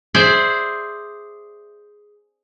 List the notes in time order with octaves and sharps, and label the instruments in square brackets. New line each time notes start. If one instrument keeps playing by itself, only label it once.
[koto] G#4 C5 D5 E5